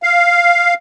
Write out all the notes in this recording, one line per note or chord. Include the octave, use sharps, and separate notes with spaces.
F5